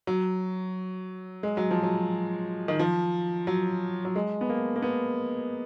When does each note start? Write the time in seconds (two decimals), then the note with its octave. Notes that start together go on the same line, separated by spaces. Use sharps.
0.07 F#3
1.43 G#3
1.57 F#3
1.71 F3
1.83 F#3
2.68 D#3
2.79 F3
3.47 F#3
4.05 F#3
4.16 G#3
4.41 B3
4.49 A#3
4.76 A#3
4.82 B3